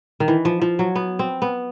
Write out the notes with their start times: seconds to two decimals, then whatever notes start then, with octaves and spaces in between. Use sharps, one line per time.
0.20 D#3
0.28 E3
0.45 F3
0.62 F3
0.79 F#3
0.95 B3
1.19 C4
1.42 B3